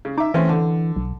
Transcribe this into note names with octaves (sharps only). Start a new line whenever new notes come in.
C#3
D#4 E5 D6
E3 A3 C4 C#4
D3
B1